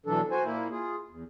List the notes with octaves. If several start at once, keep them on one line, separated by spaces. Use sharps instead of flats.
B2 E3 F#3 D4 A4
F#4 C5 G#5
A#2 A#3 E4
F4 G#4
E2